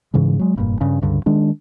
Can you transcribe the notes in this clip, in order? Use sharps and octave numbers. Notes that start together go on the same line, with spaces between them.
G#2 C#3 E3 G#3
F#3 G#3
F1 G2 A#2
G2 C#3
C#2 G2 D3
D#3 G#3 D4